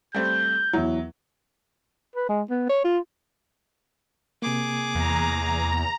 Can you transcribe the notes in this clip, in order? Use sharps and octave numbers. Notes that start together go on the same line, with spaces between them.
G3 A3 C4 G6
E2 F#3 E4
B4
G#3
B3
C#5
F4
C3 A#3 G#4 D6
E2 A#5